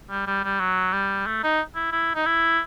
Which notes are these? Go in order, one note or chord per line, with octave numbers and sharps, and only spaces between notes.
G3
G3
G3
F#3
G3
A3
D#4
E4
E4
D#4
E4